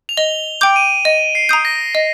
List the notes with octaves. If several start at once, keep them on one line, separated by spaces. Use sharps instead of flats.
F7
D#5 G7
G5 D6 G6 D7
D#7
D#5 D#7
C7
A#5 D#6 G6
A#6
D#5